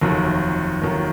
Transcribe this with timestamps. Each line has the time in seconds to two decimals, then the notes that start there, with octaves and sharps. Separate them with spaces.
0.01 F1 D#2 D#3 F#3
0.81 F1 D#2 D#3 F#3